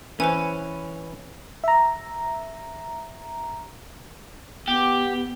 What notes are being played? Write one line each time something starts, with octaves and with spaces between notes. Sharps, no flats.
E3 C#4 B4 C5 G#5
E5 A#5
B3 G4